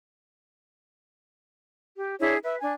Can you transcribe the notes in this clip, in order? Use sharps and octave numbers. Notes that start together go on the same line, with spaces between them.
G4
D4 E4 G#4 C#5
B4 E5
D4 G#5